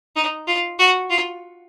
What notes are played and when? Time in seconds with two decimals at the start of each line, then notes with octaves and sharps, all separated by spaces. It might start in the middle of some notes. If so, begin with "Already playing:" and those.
0.16 D#4
0.47 F4
0.79 F#4
1.10 F4